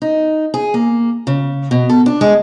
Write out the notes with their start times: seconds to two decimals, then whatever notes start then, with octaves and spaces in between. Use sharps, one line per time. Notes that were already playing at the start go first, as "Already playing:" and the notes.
0.02 D#4
0.54 G#4
0.74 A#3
1.27 C#3
1.71 B2
1.89 A4
2.06 D4
2.21 G#3